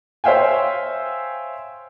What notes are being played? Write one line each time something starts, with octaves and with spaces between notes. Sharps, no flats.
C5 C#5 E5 F5 G5 G#5